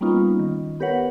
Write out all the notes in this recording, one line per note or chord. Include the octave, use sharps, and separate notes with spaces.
G3 A#3 B3 C#4 D#4 F4
D#3
B3 G4 A#4 B4 C#5 F#5